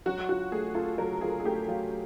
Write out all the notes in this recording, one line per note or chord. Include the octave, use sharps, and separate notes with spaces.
F#3 F#4
F4 F#4
A3 G#4
F4 A4
F#3 A#4
F4 G#4
G#4
A3 G4
F#3 F4